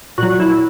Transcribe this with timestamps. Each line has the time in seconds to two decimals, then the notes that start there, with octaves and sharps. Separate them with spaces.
0.18 A#2 F#3 F#4
0.40 E4